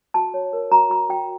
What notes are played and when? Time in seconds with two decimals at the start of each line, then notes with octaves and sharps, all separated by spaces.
0.14 F#4 A5
0.34 C#5
0.53 A#4
0.72 F#4 A#5
0.90 F#4 B5
1.09 F#4 G5